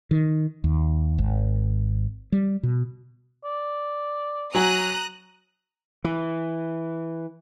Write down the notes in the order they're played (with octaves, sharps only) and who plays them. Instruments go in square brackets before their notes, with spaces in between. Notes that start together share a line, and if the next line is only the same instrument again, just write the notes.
[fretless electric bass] D#3
D#2
G#1
G3
B2
[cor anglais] D5
[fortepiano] F#3 G#5 [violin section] A#5 D#6 F#6
[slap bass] E3